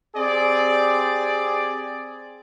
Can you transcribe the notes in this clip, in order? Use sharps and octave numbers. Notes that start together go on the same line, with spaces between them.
C4 G4 G#4 D5